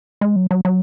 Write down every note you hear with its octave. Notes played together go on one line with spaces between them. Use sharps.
G#3
F#3
F#3
F#3